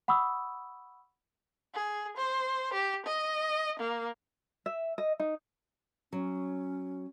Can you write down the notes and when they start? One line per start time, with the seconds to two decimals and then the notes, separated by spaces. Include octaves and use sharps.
0.08 F#5 B5 C#6 D#6 E6
1.75 G#4
2.17 C5
2.73 G4
3.06 D#5
3.80 A#3
4.66 E5
4.98 D#5
5.20 D#4
6.12 F#3 C#4